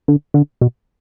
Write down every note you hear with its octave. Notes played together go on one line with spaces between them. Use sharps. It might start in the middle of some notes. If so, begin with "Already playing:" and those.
D3
D3
B2